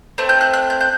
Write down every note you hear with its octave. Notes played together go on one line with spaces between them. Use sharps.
A3 C4
G6
F#6
F#6
G6
G6